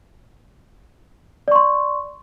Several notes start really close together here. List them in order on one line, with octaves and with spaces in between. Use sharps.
D5 C#6 C6